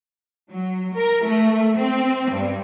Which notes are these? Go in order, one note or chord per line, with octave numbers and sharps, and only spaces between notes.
F#3
A#4
A3
C4
G2